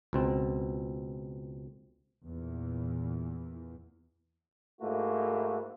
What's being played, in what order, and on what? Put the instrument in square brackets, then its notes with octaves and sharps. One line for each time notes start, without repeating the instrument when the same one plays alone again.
[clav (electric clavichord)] C#2 B2 C4
[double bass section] E2 A#2 E3
[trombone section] G#2 A3 A#3 E4 F#4